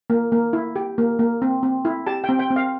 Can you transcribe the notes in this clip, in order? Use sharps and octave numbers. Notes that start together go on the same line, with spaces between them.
A#3
A#3
E4
G4
A#3
A#3
C4
C4
E4
G4 A5
G5
C4
G5
C4
F5